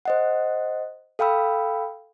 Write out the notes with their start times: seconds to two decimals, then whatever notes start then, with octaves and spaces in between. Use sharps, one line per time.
0.05 C5 D#5 F#5
1.19 A4 F5 G5 B5 E6